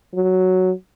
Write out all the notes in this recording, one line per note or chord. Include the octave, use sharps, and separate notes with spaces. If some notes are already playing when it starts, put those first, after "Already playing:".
F#3